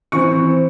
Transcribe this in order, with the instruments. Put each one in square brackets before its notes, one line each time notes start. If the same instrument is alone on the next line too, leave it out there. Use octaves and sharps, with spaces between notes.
[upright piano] E3 C4 C#6